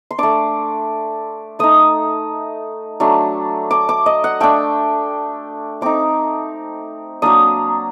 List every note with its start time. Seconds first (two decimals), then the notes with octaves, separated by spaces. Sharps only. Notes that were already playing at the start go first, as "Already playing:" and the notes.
0.11 C6
0.18 A3 D4 D6
1.59 A3 D#4 D#6
3.00 F#3 A3 D4
3.71 D6
3.89 D6
4.06 D#5
4.24 F#5
4.41 A3 D4 G5
5.81 A3 C4 D#4 D6
7.22 F#3 A#3 D4 D#6